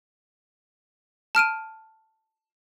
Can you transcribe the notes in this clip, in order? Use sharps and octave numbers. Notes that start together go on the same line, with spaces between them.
A5 F6 D7 D#7